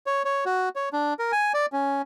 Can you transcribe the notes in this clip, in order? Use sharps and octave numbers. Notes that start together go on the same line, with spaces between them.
C#5
C#5
F#4
C#5
D4
A#4
G#5
D5
C#4